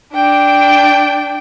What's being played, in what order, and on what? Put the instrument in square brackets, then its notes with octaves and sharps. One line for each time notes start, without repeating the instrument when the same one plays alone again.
[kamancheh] D4 G5